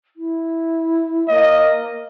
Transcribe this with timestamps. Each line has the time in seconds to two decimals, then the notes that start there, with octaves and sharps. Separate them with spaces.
0.16 E4
1.28 A#3 D#5